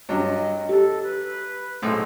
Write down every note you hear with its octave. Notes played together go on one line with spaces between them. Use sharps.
G2 F#3 D#5
G4 A4
B4
B1 A2 G#3 C5